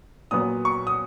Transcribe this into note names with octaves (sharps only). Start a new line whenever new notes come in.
A#2 F#3 B3 D#6
C#6
D#6